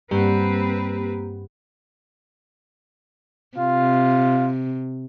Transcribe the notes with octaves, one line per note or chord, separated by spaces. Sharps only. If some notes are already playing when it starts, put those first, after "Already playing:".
G2 G3 A#3 C4 G4 B4 F#5
C3 F4